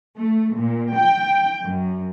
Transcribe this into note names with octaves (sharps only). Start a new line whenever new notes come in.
A3
A#2
G5
F#2